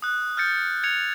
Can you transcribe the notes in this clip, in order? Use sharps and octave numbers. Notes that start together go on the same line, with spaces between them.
D#6 F#6
F6 G6 A6 C#7
G#6 C#7 F7